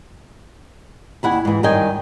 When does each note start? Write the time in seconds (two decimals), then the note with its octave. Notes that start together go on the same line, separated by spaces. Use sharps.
1.23 D#2 E4 F#5 G#5
1.45 G#2 E3
1.63 G2 D#3 C#5 D#5 G5 G#5